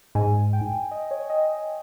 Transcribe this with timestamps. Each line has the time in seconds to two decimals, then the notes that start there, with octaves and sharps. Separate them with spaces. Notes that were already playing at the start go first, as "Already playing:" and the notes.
0.15 G#2 G#5
0.53 G5
0.91 D#5
1.11 C#5
1.30 D#5